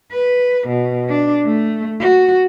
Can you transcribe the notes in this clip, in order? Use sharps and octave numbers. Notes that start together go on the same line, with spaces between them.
B4
B2
D4
A3
F#4